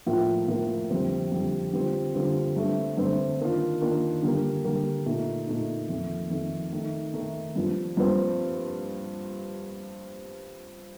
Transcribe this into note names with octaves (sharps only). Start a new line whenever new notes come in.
A2 F3 A#3 F4
A2 F3 A#3 F4
F2 D3 G3 C4
F2 D3 G3 C4
D3 G3 C4 F4
D3 G3 C4 F4
G2 D3 A3 C4
G2 D3 A3 C4
D#3 A#3 D4 F4
D#3 A#3 D4 F4
D3 G3 A#3
D3 G3 A#3
A#2 A3 D#4
A#2 A3 D#4
F2 D#3 A3
F2 D#3 A3
D#3 A3 D#4
D#3 A3 D#4
G2 F3 C4
G2 F3 C4